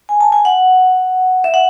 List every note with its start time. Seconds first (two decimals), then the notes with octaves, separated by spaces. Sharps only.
0.09 G#5
0.21 A5
0.32 G#5
0.45 F#5
1.44 E5
1.54 F#5